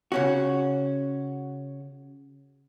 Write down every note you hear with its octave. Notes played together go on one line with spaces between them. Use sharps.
C#3 C#4 F#4